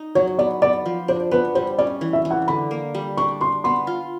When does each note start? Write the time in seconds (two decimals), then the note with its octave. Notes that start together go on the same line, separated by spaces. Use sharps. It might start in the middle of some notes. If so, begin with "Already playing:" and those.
Already playing: D#4
0.15 F#3 C#5
0.39 B3 D5
0.62 B3 D5
0.86 F3
1.08 D4 C5
1.31 B3 B4
1.55 G3 C5
1.78 C#4 D5
2.01 E3
2.13 E5
2.25 E3
2.31 F#5
2.48 D3 B5
2.71 A#3
2.95 G3
3.17 D4 C#6
3.41 D4 C6
3.64 B3 C6
3.87 F4